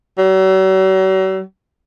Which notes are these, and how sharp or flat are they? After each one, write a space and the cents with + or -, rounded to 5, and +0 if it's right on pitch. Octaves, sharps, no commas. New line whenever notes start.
F#3 +45